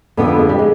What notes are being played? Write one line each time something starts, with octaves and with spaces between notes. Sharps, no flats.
F2 D3 B3
B3
G#3
G3
G#3